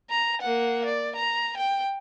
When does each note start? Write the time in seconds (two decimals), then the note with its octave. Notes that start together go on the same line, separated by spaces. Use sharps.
0.10 A#5
0.42 A#3 F#5
0.85 D5
1.16 A#5
1.57 G5